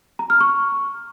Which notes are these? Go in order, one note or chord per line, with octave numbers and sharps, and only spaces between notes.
A#5
F6
C#6